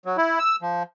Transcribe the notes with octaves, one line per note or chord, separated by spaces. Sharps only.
F#3
E4
E6
F3